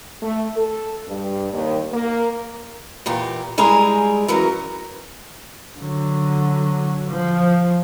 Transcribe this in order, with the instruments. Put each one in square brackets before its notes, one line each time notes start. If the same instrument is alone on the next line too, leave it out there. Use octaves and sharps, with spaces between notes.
[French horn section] A3
A4
G2
D#2
A#3
[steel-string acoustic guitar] E2 A#2 G4
G3 G#3 E4 G#4 A#5
E3 F#3 C#4 A#4
[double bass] D3 F#3
F3